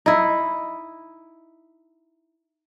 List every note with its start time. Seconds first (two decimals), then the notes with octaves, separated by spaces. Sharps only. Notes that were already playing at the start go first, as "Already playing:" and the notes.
0.06 D#4 E4